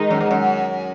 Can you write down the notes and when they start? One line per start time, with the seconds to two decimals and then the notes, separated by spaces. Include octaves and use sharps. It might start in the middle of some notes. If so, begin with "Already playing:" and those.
Already playing: D#3 G#3 D#4
0.10 F#2
0.21 G#2
0.31 F#2